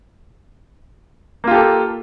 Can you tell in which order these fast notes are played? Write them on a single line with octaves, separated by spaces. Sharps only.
A#3 F4 G4 A4